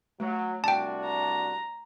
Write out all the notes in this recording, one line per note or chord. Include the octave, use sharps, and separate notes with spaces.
F#3 A3
C2 D4 F#4 G5 A5
A#5